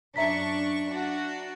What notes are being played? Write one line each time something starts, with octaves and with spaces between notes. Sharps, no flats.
F#2 D4 E5 A#5 C#6 B6
D4 F#4